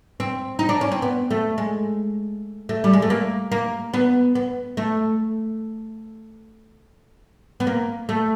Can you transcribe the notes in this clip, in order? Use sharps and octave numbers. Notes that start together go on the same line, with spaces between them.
C4
D#4
D4
C#4
C4
B3
A3
G#3
A3
G3
G#3
A3
A#3
A#3
B3
B3
A3
B3
A#3
A3